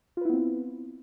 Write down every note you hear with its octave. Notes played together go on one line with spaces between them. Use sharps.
B3 C4 E4 F4 B4